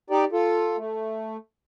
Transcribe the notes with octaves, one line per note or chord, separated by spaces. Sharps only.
D#4 G4 D5
F4 A4
A3